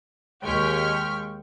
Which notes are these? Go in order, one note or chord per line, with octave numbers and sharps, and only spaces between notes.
D#2 G#3 G5 C#6 F6 B6